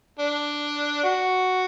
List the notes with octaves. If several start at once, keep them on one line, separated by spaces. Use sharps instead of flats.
D4
F#4